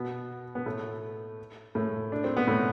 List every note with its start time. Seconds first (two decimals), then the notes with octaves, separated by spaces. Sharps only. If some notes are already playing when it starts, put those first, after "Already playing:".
Already playing: B2 B3
0.55 B3
0.66 A2 A3
1.75 A2 A3
2.12 D4
2.24 C4
2.37 B3
2.47 A2 A3